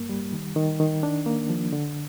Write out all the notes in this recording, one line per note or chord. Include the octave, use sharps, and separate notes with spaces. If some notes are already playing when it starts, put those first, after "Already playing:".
Already playing: G2 A#3
G3
D#3
D#3
D#3
D4
A#3
F3
D3